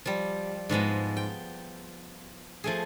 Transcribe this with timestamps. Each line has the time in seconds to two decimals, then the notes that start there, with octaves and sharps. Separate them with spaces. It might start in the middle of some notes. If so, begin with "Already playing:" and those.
0.05 F3 G3
0.69 G#2 F3 G#3 B3
1.17 G5
2.64 F3 A3 G#4